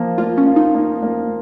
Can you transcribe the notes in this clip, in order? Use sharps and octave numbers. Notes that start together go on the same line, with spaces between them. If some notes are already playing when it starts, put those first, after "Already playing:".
Already playing: F3 A#3
A#3 F4
C#4
F4
D#4
A#3
A#3